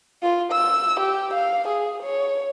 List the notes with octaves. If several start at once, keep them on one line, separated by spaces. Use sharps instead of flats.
F4
E6
G4
F5
G#4
C#5